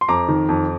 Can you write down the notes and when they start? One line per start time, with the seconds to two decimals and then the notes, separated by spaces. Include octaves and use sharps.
0.01 C6
0.08 F2 A#5 D6
0.28 D#3
0.49 F2